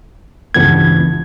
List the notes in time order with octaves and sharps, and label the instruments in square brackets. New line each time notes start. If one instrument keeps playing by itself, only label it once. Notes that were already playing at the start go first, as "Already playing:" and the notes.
[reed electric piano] C#2 G#6 [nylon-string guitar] G2 E3 B3